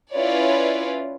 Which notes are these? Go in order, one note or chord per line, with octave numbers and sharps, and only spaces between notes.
C#4 E4 F4 B4 C#5 D5